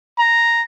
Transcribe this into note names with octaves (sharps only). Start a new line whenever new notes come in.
A#5